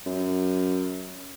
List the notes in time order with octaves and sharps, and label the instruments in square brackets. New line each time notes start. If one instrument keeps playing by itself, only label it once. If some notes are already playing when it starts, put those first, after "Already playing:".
[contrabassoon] F#2